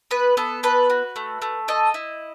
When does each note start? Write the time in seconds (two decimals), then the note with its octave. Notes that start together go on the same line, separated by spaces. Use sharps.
0.11 B3 B4
0.37 B3 A4
0.63 A4 B4
0.90 F#4
1.16 A3
1.42 A3
1.68 A4 D#5
1.94 E4